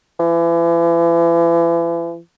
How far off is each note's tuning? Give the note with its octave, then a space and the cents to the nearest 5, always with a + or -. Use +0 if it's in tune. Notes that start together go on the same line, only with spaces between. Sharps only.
E3 +40